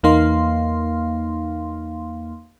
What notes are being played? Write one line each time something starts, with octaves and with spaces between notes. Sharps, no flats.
E2 A#3 D#4 F5 C6